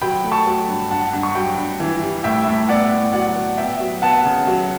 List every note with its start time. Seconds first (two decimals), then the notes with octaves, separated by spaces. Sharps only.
0.01 F#3 G5 B5
0.24 A3
0.31 A5 C#6
0.46 F#3
0.68 G2
0.91 G2 F#5 A5
1.13 G2
1.23 C#6
1.35 F#3 G5 B5
1.58 G2
1.80 E3
2.02 G3
2.24 A2 E5 G5
2.47 A2
2.69 B3 D5 F#5
2.92 A2
3.13 F#3 D5 F#5
3.36 F#3
3.58 B3 E5 G5
3.80 F#3
4.02 B3 F#5 A5
4.25 C#3
4.47 F#3